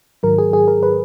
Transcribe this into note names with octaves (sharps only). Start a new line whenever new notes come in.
G#2 D#3 F#3 A#4
G#4
G#4
A#4
B4